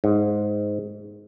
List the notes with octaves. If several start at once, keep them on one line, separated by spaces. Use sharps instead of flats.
G#2